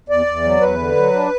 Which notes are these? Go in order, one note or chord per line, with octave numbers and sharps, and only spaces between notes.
E2 D5
E2
F#3
E2 B4
D3
F#3
D4